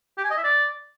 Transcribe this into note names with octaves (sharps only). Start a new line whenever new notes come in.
G4
G#5
D#5
E5
D5